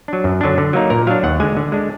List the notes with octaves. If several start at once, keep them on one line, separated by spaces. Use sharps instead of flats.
F#3 D4
F#2
D3 F#3 D4
D3
F#3 A#3 D#4
A#2 A#4
F#3 D4 F5
D#2 F#5
D3 G#3 G#5
D3
G#3 D4